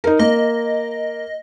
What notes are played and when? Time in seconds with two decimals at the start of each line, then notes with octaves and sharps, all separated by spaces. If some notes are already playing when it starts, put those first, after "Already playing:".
0.04 D#4 A#4
0.19 A#3 D#5